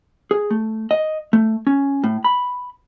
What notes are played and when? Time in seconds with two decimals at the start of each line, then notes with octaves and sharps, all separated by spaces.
0.31 G#4
0.51 A3
0.91 D#5
1.33 A3
1.67 C#4
2.04 A2
2.24 B5